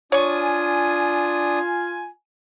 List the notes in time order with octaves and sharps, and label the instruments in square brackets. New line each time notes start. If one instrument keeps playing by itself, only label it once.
[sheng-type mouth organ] D4 D#6 [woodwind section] F4 G#5 [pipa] C#5 C#6